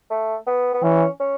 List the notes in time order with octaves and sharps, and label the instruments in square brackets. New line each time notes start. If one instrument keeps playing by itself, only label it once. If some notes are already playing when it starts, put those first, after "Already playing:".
[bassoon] A3
B3
B3
[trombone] E3 [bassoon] C#4
[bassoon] C#4